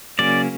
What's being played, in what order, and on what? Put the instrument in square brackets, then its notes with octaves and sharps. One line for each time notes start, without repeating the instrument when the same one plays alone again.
[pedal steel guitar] C#3 F#3 A#3 C#4 D5